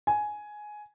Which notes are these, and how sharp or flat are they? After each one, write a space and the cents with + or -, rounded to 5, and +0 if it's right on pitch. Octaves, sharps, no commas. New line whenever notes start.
G#5 +10